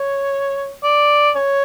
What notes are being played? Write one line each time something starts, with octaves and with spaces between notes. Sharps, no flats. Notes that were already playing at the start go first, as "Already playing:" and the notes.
Already playing: C#5
D5
C#5